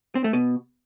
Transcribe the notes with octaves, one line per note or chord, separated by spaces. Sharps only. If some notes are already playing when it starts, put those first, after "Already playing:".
C4
A3
B2